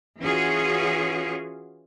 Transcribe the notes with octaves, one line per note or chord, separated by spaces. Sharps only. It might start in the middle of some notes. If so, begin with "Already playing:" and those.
E3 C#4 F4 F#4 G#4